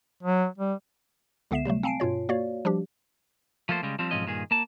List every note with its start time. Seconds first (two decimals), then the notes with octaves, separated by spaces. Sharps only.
0.23 F#3
0.58 G3
1.51 C#2 D3 B3 E5 C7 E7
1.65 C3 F#3 G3 A3
1.83 C4 F5 G#5 A5 C7 D7
2.00 G2 B2 F4 C#5
2.29 A#3 F#4 C#5 D5 F5
2.65 F3 G3 D4 G4
3.69 F3 A3 A#3 A4 C5
3.83 C#3 G3 G#3
3.99 F3 G3 C4
4.11 B1 G#2 F3 C4 C#4 D#5
4.26 G2 A#2 D#3 G#4
4.51 A#3 A5